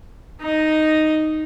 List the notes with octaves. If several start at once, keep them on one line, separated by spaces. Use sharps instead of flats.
D#4 D#5